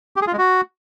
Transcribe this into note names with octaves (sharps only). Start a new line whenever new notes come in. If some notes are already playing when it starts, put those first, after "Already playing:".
G4
G#4
F4
G#3
F#4